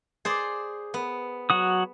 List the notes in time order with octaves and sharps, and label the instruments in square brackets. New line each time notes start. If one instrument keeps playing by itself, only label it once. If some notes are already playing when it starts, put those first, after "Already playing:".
[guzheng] G#4 C5 D5
B3
[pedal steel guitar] F#3 F#4 D#6